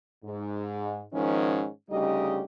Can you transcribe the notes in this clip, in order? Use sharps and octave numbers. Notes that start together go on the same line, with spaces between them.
G#2
G#2 D#3 F3 G#3 C#4
D2 C#3 G3 D#4 G4 D#5